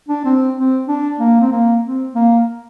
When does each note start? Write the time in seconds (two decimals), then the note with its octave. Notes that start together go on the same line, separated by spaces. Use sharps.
0.09 D4
0.25 C4
0.56 C4
0.88 D4
1.19 A#3
1.40 C4
1.52 A#3
1.84 C4
2.15 A#3